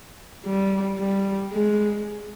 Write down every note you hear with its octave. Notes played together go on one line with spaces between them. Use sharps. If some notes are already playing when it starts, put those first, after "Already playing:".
G3
G3
G#3